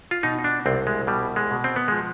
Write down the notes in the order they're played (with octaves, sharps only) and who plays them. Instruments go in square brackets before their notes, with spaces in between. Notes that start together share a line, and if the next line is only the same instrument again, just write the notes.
[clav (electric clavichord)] F4
B2 D#4
D4
C2 C4
G#3
B2 G3
G#3
B2
C4
B3
F3 G#3